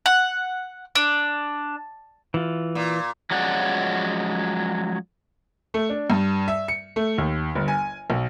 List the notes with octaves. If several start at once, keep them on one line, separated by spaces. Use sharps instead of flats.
F#5
D4
E3 F4
A#2
F3 F#3 G#3 C#4 D5 F#5
A3
D4
G2
E5
C#7
A3
D#2
G1
G#5
B1